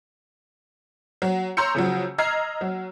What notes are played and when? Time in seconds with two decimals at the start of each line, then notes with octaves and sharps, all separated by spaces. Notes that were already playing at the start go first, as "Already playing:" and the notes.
1.22 F#3
1.57 C#5 A#5 C6 E6 G6 C#7
1.75 C#3 F3 F#3
2.18 D#5 A#5 E6 F6 G#6 C7
2.61 F#3